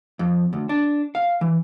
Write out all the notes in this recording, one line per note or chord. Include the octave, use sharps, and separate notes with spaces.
F2
D2
D4
F5
E3